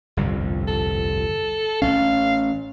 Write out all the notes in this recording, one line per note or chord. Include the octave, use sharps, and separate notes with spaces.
G1 C2 F2
A4
A1 C#4 F5